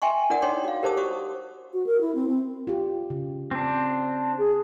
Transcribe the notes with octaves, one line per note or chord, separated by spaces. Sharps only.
E5 G5 G#5 C6 C#6
D4 E4 A#4 D5 F#5 D#6
D4 D#4 C#5 G5 C6 D6
F#4 F5
G4 A#4 C5 A5 D6 D#6
F#4 C5 C#6 D#6
F#4
A#4
E4
C4
C4
F4 G4
C#3
C4 D4
G#4